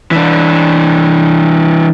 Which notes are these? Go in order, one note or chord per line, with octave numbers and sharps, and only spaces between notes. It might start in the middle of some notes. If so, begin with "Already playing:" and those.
E3 D4